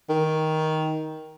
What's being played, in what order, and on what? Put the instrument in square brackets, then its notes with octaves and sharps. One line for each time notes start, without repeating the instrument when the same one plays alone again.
[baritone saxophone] D#3